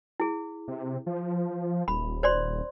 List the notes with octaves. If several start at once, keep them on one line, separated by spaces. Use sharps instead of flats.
E4 G#4
C3
F3
D#1 B5
C5 D5 C6